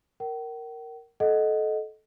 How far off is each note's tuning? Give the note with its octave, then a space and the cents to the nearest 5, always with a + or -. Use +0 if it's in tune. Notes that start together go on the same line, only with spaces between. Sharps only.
A#4 -5 G5 -45
A4 -20 D#5 +0 F#5 +0